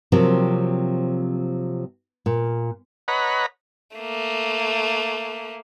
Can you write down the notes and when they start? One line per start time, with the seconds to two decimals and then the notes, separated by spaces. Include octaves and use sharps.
0.12 C3 F3 F#3 A#3 C4
2.26 A#2
3.08 B4 C#5 D#5 F#5 A#5 B5
3.97 A3 A#3